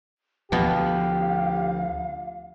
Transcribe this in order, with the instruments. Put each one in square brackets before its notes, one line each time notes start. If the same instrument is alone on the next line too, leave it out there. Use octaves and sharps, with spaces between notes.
[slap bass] D2 F3 [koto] B2 B3 [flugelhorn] G4 [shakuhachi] F5